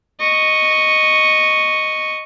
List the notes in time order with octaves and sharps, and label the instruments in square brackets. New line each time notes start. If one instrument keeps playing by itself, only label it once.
[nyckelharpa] D#5 C#6